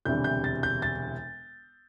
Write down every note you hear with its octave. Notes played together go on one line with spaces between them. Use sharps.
E1 D2 C3 E3 G3 G6
G6
A6
G6
A6